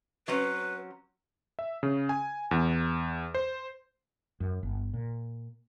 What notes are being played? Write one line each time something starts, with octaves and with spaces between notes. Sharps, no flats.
F#3 C4 C#4 B4
E5
C#3
G#5
E2
C5
F#2
G1
A#2